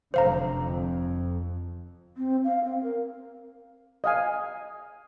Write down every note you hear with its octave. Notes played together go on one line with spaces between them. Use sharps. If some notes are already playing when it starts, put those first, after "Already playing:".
F1 F#2 D3 C5 F5 A#5
F2
C4
F5
C4
A#4
D#5 F5 G#5